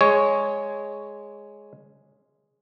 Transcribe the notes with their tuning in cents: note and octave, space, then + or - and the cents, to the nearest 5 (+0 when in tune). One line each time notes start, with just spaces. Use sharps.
G#3 +0 C#5 +0